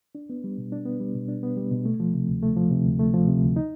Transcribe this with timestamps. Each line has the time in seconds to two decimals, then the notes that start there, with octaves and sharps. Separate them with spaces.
0.15 D4
0.30 B3
0.44 G3
0.58 B2
0.72 D4
0.86 B3
1.00 G3
1.15 B2
1.28 D4
1.43 B3
1.57 G3
1.71 B2
1.85 A3
2.00 F3
2.14 C3
2.28 D2
2.43 A3
2.56 F3
2.71 C3
2.86 D2
2.99 A3
3.14 F3
3.27 C3
3.42 D2
3.56 D#4